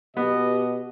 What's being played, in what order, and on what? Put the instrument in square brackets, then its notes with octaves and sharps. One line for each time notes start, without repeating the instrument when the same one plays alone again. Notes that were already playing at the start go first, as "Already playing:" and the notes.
[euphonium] B2 [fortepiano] B3 [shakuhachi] G4 [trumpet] D#5